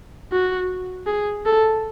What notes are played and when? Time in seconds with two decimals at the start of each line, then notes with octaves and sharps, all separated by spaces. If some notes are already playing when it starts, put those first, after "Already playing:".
0.32 F#4
1.07 G#4
1.46 A4